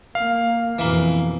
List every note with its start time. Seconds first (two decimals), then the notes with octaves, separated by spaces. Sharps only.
0.15 A#3 F5
0.79 F2 B2 E3 A#3